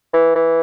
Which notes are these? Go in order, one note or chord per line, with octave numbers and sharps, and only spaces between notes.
E3
E3